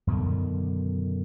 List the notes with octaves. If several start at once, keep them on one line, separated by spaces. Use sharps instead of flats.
F#2 B2 D3 D#3